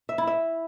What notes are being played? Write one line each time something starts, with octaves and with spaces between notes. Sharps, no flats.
E5
E4
E5